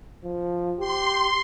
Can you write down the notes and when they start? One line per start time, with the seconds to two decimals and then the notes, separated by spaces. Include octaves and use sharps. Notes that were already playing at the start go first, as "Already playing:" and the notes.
0.24 F3
0.80 G4 C6